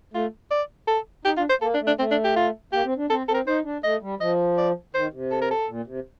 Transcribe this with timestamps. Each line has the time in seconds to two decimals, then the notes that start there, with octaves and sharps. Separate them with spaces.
0.14 A3 F4
0.51 D5
0.87 A4
1.25 D#4 G4
1.37 D4 F4
1.50 C5
1.62 A#3 A4
1.74 D4
1.80 A3
1.87 D4
1.99 A3 C4
2.11 D4
2.24 G4
2.36 F4
2.73 A#3 G4
2.85 C4
2.97 D4
3.10 C4 A4
3.28 C4 A4
3.34 A#4
3.47 D#4 C5
3.65 D4
3.84 A3 D#5
4.02 G3
4.20 F3 D#5
4.58 D5
4.95 D#3 C5
5.13 C3
5.31 A4
5.42 A#4
5.51 A4
5.69 A#2
5.87 C3